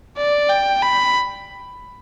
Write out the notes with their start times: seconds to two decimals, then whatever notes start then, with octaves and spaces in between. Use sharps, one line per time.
0.17 D5
0.49 G5
0.82 B5